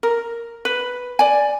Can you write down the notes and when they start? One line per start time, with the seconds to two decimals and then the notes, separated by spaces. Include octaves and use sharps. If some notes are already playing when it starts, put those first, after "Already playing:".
0.03 A#4
0.65 B4
1.19 D5 G#5